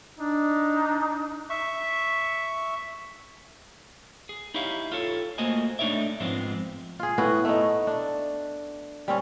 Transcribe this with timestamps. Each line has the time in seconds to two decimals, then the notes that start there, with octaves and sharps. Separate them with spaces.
0.19 D4 D#4
1.50 E5 C#6
4.29 G#4
4.54 D#4 E4 G4 C#5 F5
4.92 F4 A4 C#5
5.38 A3 A#3 F#4 C5 D#5 G#5
5.79 A3 D4 D#4 C#5 D5 E5
6.20 G#2 F3 G#3 B3 C4 F4
6.99 F4 G#4
7.18 A2 B3 F#4
7.45 A3 B3 D#4
7.87 D4
9.08 G3 C4 C#4